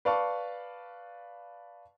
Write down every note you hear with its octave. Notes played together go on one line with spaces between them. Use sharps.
B4 D5 F5 A5 C#6